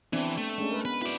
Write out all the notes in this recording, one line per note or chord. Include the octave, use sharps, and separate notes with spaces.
E3 B3 C4 D4
A3
G#3 C#4 D4
A#4 B4
B3 B4
E4 F#4 B4 D5